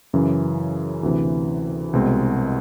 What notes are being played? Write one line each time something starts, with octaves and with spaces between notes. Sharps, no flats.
F#2 C#3 E3
D2 C3 E3
C2 B2 G#3 C4